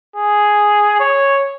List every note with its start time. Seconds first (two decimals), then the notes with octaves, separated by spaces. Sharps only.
0.16 G#4
1.00 C#5